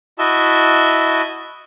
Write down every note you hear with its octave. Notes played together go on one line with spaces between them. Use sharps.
E4 F#4 D#5 E5 A5